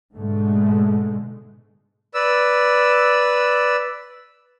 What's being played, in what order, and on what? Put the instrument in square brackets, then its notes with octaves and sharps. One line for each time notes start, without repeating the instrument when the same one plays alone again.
[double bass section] G#2 B2 D3 G#3 A3
[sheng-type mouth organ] B4 D5 E6